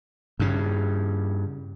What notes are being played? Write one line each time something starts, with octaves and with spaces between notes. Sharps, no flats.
G2 C#3